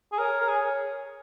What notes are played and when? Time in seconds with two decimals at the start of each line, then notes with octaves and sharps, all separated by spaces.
0.12 G#4
0.18 A#4 C#5
0.41 A#4
0.49 G#4